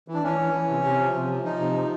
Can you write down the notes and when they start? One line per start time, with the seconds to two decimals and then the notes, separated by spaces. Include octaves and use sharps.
0.08 E3
0.14 D4
0.23 E3 C#4
0.39 E3
0.53 E3
0.69 C3
0.84 C3
0.99 F3
1.15 C3
1.30 F3
1.45 F3 D#4
1.60 C3
1.75 F3